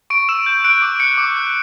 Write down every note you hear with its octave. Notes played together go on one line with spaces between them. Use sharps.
C#6 D7
E6 E7
G6
F#6 D7
D6
F#6 C#7
D6
F#6